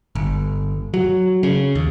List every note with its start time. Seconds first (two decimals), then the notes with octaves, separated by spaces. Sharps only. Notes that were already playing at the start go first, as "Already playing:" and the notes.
0.15 G1
0.94 F#3
1.43 C#3
1.75 D#2